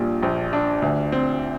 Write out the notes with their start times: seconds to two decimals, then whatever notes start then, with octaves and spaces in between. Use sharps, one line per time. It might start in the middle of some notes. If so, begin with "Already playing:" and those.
Already playing: A#1 A#2 G3 D4
0.23 A#1
0.53 D4
0.82 D2
1.12 C4